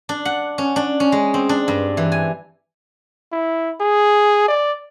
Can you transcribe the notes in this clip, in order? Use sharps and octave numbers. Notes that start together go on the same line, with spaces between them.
D4
F#5
C#4
D4
C#4
G#3
C4
D4
G2
E3
G#5
E4
G#4
D5